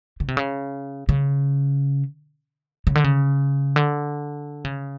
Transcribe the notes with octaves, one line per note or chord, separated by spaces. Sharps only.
C#3
C3
C#3
C#3
C#3
D3
C#3
D3
C#3